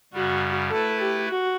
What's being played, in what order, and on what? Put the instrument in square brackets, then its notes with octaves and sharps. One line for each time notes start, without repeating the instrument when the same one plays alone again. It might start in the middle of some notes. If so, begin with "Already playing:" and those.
[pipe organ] F#2 C#3 G3 [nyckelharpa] F#4
[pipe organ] A3 E4 B4 [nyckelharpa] A4
[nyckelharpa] G4
F#4